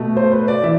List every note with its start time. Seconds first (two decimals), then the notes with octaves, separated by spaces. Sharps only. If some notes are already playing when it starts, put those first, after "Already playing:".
Already playing: B2 A3
0.17 C5
0.32 B4
0.48 D5
0.63 E3 E5